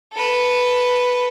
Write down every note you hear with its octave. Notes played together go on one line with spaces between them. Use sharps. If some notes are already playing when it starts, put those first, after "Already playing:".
A4 B4